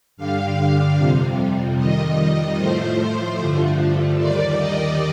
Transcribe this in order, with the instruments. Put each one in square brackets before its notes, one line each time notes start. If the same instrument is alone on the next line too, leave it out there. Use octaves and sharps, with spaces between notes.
[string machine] G2 D3 G3 F5
F2 C3 G3
F2 D#3 G3 D#5
A2 F3 A3 C5
G2 D3 F3 A3
D#2 D#3 G3 D5
D#5